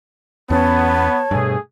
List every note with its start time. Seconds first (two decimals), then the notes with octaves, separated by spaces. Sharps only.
0.50 E2 B3 C#4 C#5 A5
1.31 G2 B2 A3 G#4